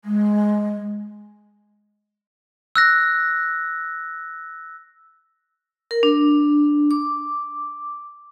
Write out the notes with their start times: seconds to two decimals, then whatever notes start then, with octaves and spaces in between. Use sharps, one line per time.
0.04 G#3
2.76 E6 F#6 A#6
5.91 A#4
6.03 D4
6.91 D6